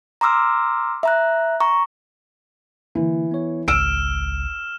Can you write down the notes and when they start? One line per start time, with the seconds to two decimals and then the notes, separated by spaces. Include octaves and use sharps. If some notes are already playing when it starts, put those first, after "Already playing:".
0.21 A#5 C6 D6 E6 F6
1.03 E5 A#5 F#6
1.60 A#5 C#6
2.95 D3 E3 A#3
3.31 B3 C#5
3.68 G#1 C#2 E6 F6 D7 E7